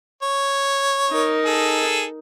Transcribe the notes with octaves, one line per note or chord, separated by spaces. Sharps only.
C#5
D#4 A#4
G#4 A4